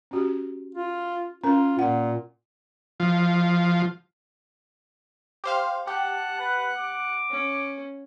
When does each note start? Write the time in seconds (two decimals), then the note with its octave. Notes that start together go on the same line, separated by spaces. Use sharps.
0.11 C#4 F#4 G4
0.75 F4
1.44 C#4 F4 A#4
1.79 A#2 F#5
3.00 F3
5.44 G4 C5 F5
5.87 G4 F#5 A5
6.39 B4
6.77 D6
7.30 C#4